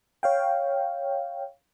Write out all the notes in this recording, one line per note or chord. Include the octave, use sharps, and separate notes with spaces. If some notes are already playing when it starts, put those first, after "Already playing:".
C#5 F5 G5